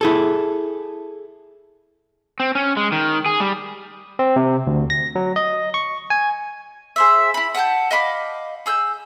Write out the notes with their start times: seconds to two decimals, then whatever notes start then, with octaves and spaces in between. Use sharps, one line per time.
0.01 E4 G#4 A4
2.40 C4
2.55 C#4
2.77 G#3
2.92 D#3
3.26 G#4
3.40 G3
4.19 C4
4.36 C3
4.67 D2
4.90 A#6
5.15 F#3
5.36 D#5
5.74 C#6
6.10 G#5
6.96 G#4 C5 E5
7.34 E4 B5
7.55 F#5 G5 A5 G6
7.91 D#5 F5 B5 D6
8.66 G#4 E6 G6